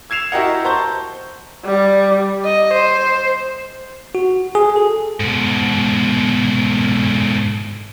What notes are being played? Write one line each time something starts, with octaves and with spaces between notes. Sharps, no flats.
E6 G#6 C7 E7 F7
E4 F#4 G4 A#4 D#5 F#5
C5 A5 A#5 C#6 G6
G3
D#5
C5
F#4
G#4
A4
G#2 B2